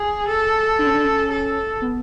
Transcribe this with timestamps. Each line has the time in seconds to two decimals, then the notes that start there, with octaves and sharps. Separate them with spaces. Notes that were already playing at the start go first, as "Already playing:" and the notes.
Already playing: G#4
0.28 A4
0.79 D4
0.87 C#4
0.94 D4
1.05 C#4
1.31 A4
1.82 B3